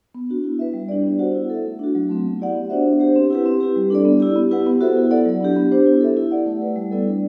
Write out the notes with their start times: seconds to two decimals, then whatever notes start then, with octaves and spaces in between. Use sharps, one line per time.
0.15 B3
0.30 D4 F#4
0.44 E4
0.59 B4 E5
0.74 G3
0.89 B3 D4 G4 D5
1.04 B3
1.19 F#4 C5 F#5
1.35 E4
1.49 A4 E5
1.65 A3
1.79 D4 F#4
1.95 F#3
2.09 A3 C4
2.25 B3
2.39 E4 G4 D5 F#5
2.54 B3
2.70 D4 F#4 C5 E5
2.85 D4
3.00 G4 C5 F#5
3.16 C4
3.31 E4 G4 B4
3.46 C4
3.60 E4 G4
3.76 G3
3.90 D4 A4 D5
4.05 B3
4.20 E4 G4
4.36 B3
4.51 E4 G4 B4 F#5
4.66 B3
4.81 F#4 A4 C5 E5
4.96 E4
5.11 A4 D5 F#5
5.26 F#3
5.41 B3 D4 G4
5.56 B3
5.72 D4 G4 C5
5.86 E4
6.01 A4 E5
6.17 E4
6.31 G4 D5 F#5
6.46 A3
6.62 E4 B4
6.76 G3
6.91 B3 E4 A4 D5
7.06 D4